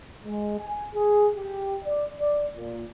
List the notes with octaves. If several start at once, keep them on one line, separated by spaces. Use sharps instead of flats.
G#3
G#5
G#4
G4
D5
D5
A#2